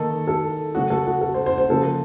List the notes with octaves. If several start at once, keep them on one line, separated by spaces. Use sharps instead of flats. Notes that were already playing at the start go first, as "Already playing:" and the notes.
Already playing: D#3 A#3 D#4 A4
A4
C#3 F#3 A3 C#4 F#4
A4
F#4
A4
C5
C5
C5
C#3 F3 A#3 A4